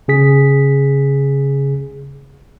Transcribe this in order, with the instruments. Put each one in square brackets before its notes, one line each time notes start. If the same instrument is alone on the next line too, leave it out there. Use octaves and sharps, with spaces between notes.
[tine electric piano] C#3 G#4 B6